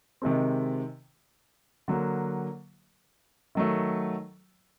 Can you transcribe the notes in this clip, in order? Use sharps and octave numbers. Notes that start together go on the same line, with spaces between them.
C3 D#3 G#3 C4
D3 F#3 A#3
D#3 F#3 A3